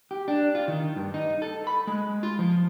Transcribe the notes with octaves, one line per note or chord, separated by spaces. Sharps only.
G4
D4
F4
D#3
G2
D#4
A4
B5
G#3
F4
F3